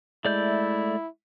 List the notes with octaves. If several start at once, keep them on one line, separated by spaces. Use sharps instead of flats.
G#3 A3 E4 D5 G6